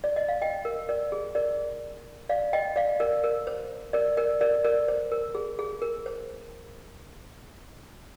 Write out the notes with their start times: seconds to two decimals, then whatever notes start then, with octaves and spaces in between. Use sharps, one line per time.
0.04 D5
0.16 D#5
0.29 F5
0.42 D#5 G5
0.65 A#4
0.89 A#4 D5
1.12 G#4
1.35 A#4 D5
2.29 D5 F5
2.53 D#5 G5
2.76 D5 F5
3.00 A#4 D5
3.24 A#4
3.47 C5
3.93 A#4 D5
4.17 A#4 D5
4.41 A#4 D5
4.65 A#4 D5
4.88 C5
5.12 A#4
5.35 G#4
5.59 G#4
5.82 A#4
6.06 C5